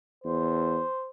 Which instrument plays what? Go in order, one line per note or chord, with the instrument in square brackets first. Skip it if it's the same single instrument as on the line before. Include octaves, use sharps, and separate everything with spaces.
[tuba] E2 [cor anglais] C5